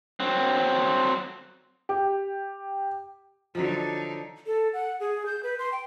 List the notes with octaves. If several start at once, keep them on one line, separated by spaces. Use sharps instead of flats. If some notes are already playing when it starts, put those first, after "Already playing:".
F#3 C4
G4
D3 F3 F#3 D#4
A4
F#5
G#4
G6
B4
C6
G5